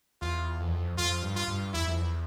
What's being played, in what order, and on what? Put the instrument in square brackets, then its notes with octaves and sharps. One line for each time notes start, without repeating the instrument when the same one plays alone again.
[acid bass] E2 [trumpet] F4
[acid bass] F2
E2
F2
[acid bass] F2 [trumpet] F4
[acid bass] G2
[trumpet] F4
[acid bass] G2
[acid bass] E2 [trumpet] E4
[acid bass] F2
E2